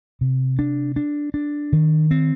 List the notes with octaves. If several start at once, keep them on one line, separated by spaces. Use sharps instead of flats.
C3
D4
D4
D4
D#3
C4